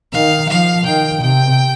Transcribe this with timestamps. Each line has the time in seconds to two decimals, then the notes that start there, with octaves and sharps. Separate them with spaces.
0.13 D#3 F5
0.49 F3 F5
0.86 D#3 G5
1.22 C3 G5